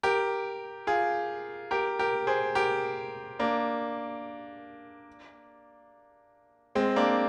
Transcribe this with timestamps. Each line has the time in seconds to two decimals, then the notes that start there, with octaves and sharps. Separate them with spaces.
0.03 G4 A#4
0.87 F4 G#4
1.71 G4 A#4
1.99 G4 A#4
2.27 G#4 C5
2.55 G4 A#4
3.39 A#3 D4
6.75 G#3 C4
6.96 A#3 D4